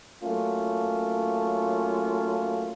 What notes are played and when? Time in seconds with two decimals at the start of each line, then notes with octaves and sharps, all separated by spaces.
0.23 F#3 A3 A#3 C#4 F4